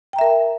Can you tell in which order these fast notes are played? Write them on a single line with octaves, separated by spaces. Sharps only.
G5 A#5 E5 A#4 A5